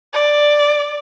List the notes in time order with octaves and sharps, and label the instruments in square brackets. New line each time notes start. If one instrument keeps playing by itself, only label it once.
[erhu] D5